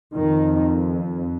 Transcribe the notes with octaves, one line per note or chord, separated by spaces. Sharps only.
F2 D#3